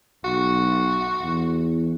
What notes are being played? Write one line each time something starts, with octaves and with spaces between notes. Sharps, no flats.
B1 F#4
E2